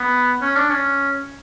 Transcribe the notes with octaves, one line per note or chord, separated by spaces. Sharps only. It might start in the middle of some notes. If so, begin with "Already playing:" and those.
Already playing: B3
C#4
D4
C#4